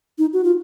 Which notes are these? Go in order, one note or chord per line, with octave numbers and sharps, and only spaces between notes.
D#4
F#4
F4